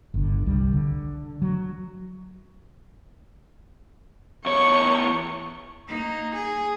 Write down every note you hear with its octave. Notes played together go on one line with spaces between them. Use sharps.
G1 D3
C2 G3
D3
F#3
E2 C#5 C#6
A#3 D#4
G#4